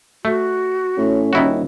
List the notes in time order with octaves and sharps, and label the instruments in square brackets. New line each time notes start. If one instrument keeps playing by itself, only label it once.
[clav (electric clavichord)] A3 [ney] F#4
[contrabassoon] A2 [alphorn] C#4
[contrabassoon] D#1 [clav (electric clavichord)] D#3 E4 F#4